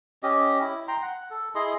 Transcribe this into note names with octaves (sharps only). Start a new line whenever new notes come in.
C#4 G4 D#5
E4
G5 A#5 C6
F#5
A4
E4 G#4 D#5 C6